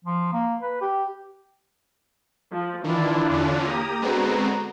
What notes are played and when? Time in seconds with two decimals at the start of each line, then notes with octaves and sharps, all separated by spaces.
0.05 F3
0.33 A#3
0.62 B4
0.81 G4
2.52 F3
2.84 D#3 E3 D4 E4 F4
3.29 E2 D3 C#4
3.67 A#3 G4 A#5 D#6
4.02 D3 G#3 B3 C4 F#4 A#5